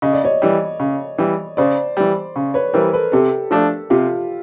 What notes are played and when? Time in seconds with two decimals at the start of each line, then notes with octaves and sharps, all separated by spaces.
0.02 C#3 D#5
0.13 D5
0.24 C#5 D#5
0.42 E3 G3
0.80 C#3
1.18 E3 G3
1.57 C#3 C5 D5
1.97 E3 G3
2.36 C#3
2.54 B4 C#5
2.73 E3 G3 A#4 C5
2.93 A4 B4
3.12 C3 G4 A4
3.51 F3 A3 D4
3.90 C3 F4 G4